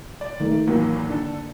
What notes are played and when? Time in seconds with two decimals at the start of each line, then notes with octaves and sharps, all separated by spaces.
0.21 D5
0.40 D#3 A3
0.67 E2 A2 F#3 A#3
1.10 D3 D4 A4